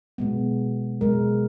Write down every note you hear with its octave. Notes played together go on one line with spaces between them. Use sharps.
B2 G#3 B3
B2 G#3 B3 A#4